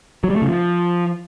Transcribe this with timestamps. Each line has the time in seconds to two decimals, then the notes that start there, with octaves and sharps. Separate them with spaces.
0.24 F#3
0.30 G3
0.36 A3
0.42 C#3
0.48 F3